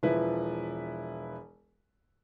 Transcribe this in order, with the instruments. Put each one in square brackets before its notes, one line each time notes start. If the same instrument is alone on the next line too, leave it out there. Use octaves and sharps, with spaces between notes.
[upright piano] E1 F3 E4 B4